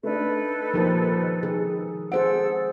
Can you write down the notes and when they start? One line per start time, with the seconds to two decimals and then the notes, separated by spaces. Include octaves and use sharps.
0.03 A3 D4 D#4 A4 B4
0.74 D#2 A#2 F3 A#4 C5
1.43 D#3 G#4
2.12 G#4 A4 C5 F#5 E6 D7